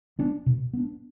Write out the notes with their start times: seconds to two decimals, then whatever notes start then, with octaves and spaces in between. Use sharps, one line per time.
0.19 B3 D4
0.46 B2
0.73 B3 D4